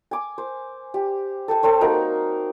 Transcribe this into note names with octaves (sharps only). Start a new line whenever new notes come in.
G#5 D6
C5
G4
A4 G5 A5
C4 A4 C5 C#5
A#3 D#4 F#4 A#4